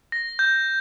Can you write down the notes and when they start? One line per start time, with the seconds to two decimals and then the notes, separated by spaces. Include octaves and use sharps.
0.12 A#6
0.39 G6